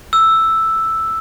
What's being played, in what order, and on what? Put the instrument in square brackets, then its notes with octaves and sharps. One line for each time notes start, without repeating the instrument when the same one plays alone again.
[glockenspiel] E6